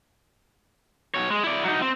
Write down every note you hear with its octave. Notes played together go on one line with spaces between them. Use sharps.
B2 C#5
G#3
E4 D5
F#3 D#4
C4